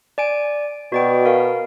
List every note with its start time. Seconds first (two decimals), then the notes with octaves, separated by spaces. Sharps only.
0.18 D5 G#5 D7
0.92 B2 F#4 D5 G5
1.25 A#4 F5